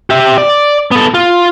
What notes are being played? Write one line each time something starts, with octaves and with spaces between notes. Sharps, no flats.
G4 E5
D5
B3 A4
F4